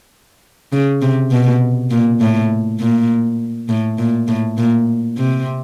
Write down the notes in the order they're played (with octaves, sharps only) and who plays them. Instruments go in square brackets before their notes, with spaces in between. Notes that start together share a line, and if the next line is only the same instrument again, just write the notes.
[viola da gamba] C#3
C3
B2
A#2
A2
A#2
A2
A#2
A2
A#2
C3